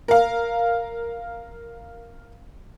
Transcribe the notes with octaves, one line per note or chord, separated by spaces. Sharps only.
A#4 F5